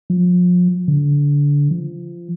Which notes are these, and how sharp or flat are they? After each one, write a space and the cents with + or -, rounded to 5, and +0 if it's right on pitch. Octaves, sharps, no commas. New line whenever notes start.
F3 +35
D3 -25
F3 -20